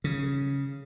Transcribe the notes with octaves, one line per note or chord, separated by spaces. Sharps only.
C#3